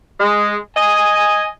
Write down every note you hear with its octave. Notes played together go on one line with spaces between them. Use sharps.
G#3
D#5 G#5